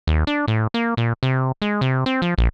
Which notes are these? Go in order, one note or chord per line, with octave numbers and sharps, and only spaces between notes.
D#2
D4
A2
A#3
A#2
C3
G#3
C3
C4
F3
A#1